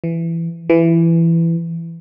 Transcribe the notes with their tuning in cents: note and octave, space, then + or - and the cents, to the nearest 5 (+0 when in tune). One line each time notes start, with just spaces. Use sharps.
E3 +15
E3 +15